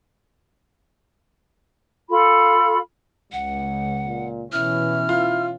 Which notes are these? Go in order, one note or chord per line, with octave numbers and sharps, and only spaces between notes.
F4 A4 B5
C#2 F#5
A#2
B2 E3 C#4 E4 F6
F4